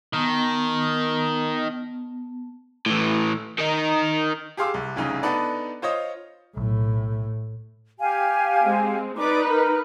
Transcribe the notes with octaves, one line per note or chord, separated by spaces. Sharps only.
D#3 B3 A5
A2 E3
D#3 D#4
G4 G#4 F5 C6 D6 E6
C2
F1 C2 C#3 D#4
B3 D4 D#4 A4 B4 D5
F4 C5 C#5 D#5
B1 A2
G4 F5 G#5
G#3 C4
D#4 B4 D5 D6
A#4